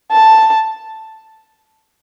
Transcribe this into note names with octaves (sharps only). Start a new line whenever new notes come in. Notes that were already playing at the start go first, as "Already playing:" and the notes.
A5